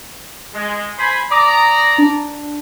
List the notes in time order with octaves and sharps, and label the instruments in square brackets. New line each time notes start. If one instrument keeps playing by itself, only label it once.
[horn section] G#3
C5 G#5 B5
[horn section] D5 A#5 [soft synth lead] D#6
[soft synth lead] D4